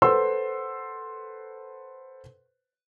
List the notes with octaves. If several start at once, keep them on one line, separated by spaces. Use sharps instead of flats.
A4 B4 C5 F#5 C6 E6